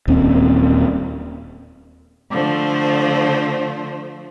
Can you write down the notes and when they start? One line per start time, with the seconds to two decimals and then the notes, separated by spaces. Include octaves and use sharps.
0.08 D#1 D#2 C4 C#4
2.30 D3 F3 A3 C5